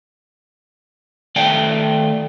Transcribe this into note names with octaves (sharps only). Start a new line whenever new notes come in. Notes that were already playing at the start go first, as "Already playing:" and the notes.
D#3 A3 D5 F5 G5 A5